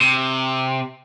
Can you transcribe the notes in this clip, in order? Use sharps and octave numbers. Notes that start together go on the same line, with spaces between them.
C3